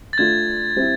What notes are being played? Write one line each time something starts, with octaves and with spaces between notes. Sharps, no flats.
A6
A3 D4 F4 G#6
G3 C4 E4